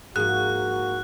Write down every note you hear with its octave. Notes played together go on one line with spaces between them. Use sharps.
G#2 F3 A#3 F#4 F#6